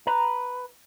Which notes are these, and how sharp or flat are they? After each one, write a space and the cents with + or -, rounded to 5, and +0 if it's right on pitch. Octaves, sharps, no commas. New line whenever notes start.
B4 +0 A#5 +0